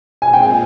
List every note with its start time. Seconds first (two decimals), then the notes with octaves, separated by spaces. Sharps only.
0.22 A#2 G#3 C4 F4 G#5
0.33 G5
0.43 G#5